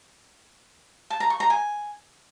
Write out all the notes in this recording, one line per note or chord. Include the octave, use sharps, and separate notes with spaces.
A5
A#5
C#6
A#5
G#5